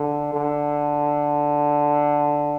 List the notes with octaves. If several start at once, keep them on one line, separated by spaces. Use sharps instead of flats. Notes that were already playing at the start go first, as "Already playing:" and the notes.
Already playing: D3
D3